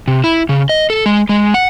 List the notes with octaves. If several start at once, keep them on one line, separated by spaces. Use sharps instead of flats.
C3
E4
C#3
D#5
A4
G#3
G#3
F#5